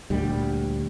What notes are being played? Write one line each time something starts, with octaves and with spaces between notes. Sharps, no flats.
D2 A#2 G3